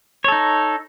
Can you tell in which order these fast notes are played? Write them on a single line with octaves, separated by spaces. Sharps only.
C#5 A4 D#4